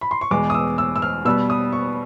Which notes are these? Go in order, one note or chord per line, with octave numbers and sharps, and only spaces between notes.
B5
C6
C#6
E2 B2 G#3 D6
D#6
E6
E6
E6
F6
B2 G3 B3 E6
D#6
C#6